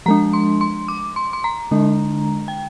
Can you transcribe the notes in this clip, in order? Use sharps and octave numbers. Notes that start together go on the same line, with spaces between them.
F3 G#3 D4 A#5
C6
C6
D6
C6
C6
A#5
D3 G#3 D4
G5